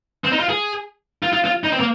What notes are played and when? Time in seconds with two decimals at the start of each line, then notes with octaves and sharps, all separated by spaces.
0.24 C4
0.32 D#4
0.40 F4
0.49 G#4
1.23 F4
1.33 F4
1.45 F4
1.64 D#4
1.72 C4
1.80 A#3